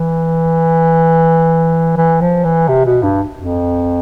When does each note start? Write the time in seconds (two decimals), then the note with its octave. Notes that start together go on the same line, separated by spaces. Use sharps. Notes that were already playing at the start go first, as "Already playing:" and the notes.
Already playing: E3
1.97 E3
2.21 F3
2.44 E3
2.69 C3
2.86 B2
3.03 G2
3.39 F2